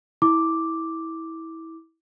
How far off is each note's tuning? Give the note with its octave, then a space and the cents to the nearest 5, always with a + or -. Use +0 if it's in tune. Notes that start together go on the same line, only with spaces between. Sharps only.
E4 -20 D6 +0